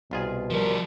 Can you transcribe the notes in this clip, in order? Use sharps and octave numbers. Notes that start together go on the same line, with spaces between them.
C2 B2 F4 G#4
F3 G3 A#4